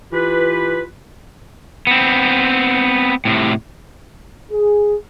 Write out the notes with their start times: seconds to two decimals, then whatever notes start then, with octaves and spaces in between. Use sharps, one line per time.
0.12 E3 F4 G4 B4
1.87 B3 C4
3.25 A2 C3
4.50 G#4